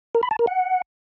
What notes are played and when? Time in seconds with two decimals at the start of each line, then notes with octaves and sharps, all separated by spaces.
0.15 A#4
0.23 B5
0.31 A5
0.39 A#4
0.47 F#5